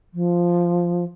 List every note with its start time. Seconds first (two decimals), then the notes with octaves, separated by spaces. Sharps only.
0.14 F3